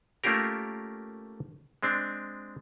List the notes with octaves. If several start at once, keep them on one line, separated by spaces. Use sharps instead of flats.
A3 A#3 C#4 F4 G4 A#4
G#3 C4 D4